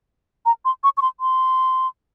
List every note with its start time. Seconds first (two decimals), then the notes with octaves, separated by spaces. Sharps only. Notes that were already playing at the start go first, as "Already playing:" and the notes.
0.46 A#5
0.65 C6
0.84 C#6
0.97 C#6
1.02 C6
1.20 C6